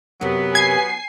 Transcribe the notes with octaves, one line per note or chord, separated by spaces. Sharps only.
F#2 C3 F#3 B3
G#5 G#6 C7